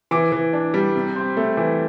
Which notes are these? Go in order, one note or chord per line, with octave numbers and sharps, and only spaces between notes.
E3 D6
E3
D4
G3
C3
C4
A3
E3